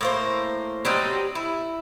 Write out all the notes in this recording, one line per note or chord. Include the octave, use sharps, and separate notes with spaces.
A2 A#3 C5
F#3 G3 C4 D#4
E4